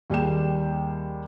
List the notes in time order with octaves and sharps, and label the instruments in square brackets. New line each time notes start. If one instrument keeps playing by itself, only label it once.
[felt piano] D#2 G3 G#4 G5 E7